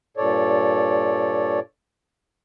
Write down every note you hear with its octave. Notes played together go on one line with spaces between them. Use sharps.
G2 A#2 A4 C#5 D5